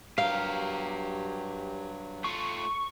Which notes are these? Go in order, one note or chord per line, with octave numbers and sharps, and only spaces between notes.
G2 F#3 G4 A#4 F5
A3 F4 C#6